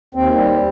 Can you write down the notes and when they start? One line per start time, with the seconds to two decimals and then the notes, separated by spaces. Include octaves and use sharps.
0.14 D#2 C4
0.36 G3